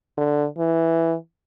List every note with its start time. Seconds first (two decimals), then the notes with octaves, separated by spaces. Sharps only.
0.18 D3
0.58 E3